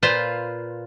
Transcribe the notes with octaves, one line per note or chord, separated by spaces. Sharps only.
A#2 F4 B4 C5